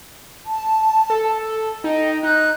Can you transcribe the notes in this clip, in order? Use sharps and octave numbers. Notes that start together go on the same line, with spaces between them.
A5
A4
D#4 D#5 G5
D#4 F#6 G6